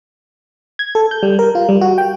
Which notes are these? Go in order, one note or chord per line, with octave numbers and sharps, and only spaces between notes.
G#6
A4
G6
G3
A#4
F4
G3
F#4
G5